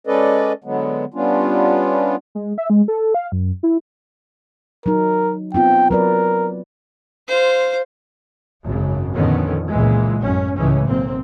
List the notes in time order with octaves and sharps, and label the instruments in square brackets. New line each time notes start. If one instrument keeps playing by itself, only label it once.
[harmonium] G#3 C#4 A4 B4 D5 D#5
D3 F#3 G#3 B3
G3 B3 C#4 D4 F4
[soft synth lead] G#3
E5
G#3
A4
F5
F#2
E4
[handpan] F#3 D#4 [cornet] A#4
[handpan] B3 C4 F4 [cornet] G5
[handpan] F#3 B4 D5 [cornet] A#4
[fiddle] F4 C5
[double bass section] G#1 F#2 C#3
F2 A#2 D3 D#3 B3 C#4
C#2 A#2 E3 G#3
A1 F#2 A2 C#4
C#2 A2 C#3 E3 G#3 C#4
B1 A#3 C4